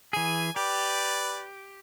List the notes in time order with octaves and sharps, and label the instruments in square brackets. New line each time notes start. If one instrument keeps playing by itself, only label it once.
[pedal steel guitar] E3 G#4 [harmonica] G#5
[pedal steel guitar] G4 [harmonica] B4 D5